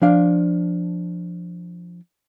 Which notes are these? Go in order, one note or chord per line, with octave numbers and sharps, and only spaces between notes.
F3 D4 F5